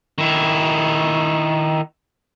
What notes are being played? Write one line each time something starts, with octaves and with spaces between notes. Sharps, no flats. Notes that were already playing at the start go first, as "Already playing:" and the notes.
D#3 E4